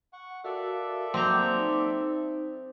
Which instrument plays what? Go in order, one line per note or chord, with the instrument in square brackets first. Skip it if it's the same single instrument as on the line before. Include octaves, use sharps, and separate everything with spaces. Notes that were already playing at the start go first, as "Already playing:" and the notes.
[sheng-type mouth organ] F#5 C#6
[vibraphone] F#4 A#4 F5 [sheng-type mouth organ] A4 D5 E5
[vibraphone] F#3 A#3 D6 [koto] C4 A#5
[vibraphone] D#4